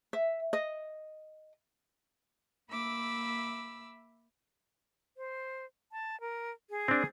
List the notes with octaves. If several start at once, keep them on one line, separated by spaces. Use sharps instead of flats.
E5
D#5
A#3 E5 B5 D6 E6
C5
A5
A#4
G#4
C4 D4